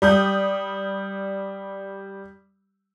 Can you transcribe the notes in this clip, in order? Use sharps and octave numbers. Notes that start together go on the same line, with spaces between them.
G3 D#6 G6